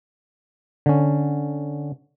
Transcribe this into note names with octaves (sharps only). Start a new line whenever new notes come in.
D3 C#4